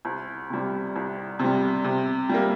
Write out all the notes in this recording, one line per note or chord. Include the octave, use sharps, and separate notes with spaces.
C2
C3 G3
C2
C3 G3
C3
G3 A#3